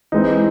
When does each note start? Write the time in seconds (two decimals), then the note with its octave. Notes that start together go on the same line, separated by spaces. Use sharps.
0.12 E3 G#3 C4 D#4